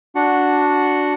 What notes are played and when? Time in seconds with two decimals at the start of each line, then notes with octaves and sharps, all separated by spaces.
0.15 D4 F#4 F#5